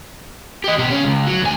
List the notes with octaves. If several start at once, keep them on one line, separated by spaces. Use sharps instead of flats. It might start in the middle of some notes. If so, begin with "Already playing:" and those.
G4 D#5
B2 G4
C#3 C#4
C#2
F#3
D2 G#5